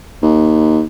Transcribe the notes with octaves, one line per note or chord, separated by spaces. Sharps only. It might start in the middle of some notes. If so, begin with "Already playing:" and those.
D#2